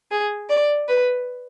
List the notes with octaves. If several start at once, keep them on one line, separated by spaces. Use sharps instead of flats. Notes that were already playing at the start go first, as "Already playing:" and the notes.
G#4
D5
B4